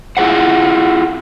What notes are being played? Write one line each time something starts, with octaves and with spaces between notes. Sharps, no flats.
E4 F4 G#4 C5 F#5